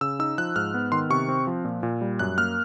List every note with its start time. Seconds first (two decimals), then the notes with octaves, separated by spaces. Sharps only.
0.01 C#3 E6
0.19 D#4 E6
0.38 F3 F#6
0.56 G#2 F6
0.74 B3
0.92 D#3 C6
1.10 C3 C#6
1.29 C4
1.47 F3
1.65 A#2
1.83 A#2
2.01 G3
2.19 F#2 F#6
2.38 A#3 F6